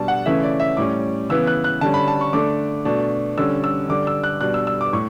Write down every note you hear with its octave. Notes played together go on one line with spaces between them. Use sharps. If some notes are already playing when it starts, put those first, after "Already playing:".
Already playing: B2 G3 D4 A5
F#5
C#3 E3 A3 C#4 E5
D5
E5
A2 G3 C#4 D6
C#3 E3 B3 E6
F#6
F#6
D3 G3 C#4 A5
B5
A5
C#6
D3 A3 D4 D6
B2 A3 D4
D3 G3 C#4 E6
E6
D3 G3 D4 D6
E6
F#6
B2 G3 D4 F#6
E6
E6
D6
A2 C#6